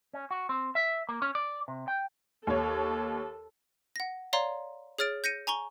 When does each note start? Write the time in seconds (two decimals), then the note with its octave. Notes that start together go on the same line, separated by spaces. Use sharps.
0.13 C#4
0.31 F#4
0.49 C4
0.75 E5
1.09 A#3
1.22 C#4
1.35 D5
1.68 C3
1.88 G5
2.47 D#2 A4 C#5
3.96 F#5 A#6
4.33 C#5 D5 F5 A#5 C6
4.99 G#4 C#5 F6 A6 D7
5.24 G6 A#6 C#7 D#7
5.47 G#5 A#5 C#6 G7